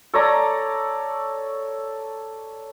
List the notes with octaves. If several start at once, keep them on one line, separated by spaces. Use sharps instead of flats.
A4 C#5 D5 A#5